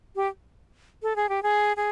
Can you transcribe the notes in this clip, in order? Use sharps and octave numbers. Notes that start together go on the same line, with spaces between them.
G4
A4
G#4
G4
G#4
G#4